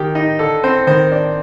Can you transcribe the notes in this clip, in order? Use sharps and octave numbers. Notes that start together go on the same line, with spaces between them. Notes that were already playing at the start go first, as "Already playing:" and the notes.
Already playing: D#3 G4
D#4
D3 A4
C4 C5
D#3 C5
D4